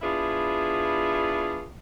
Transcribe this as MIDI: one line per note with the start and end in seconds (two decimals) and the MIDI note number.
0.02 1.65 59
0.02 1.65 62
0.02 1.65 64
0.02 1.65 65
0.02 1.65 68